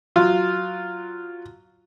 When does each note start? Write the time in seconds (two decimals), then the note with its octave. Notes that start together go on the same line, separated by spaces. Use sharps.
0.16 F#3 F4